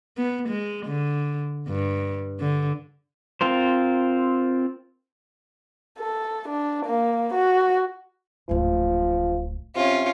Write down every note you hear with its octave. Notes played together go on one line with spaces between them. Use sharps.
B3
G#3
D3
G2
D3
C4 F4 A#4 C5
A4
D4
A#3
F#4
D1 G#1 F3
C3 C#4 F4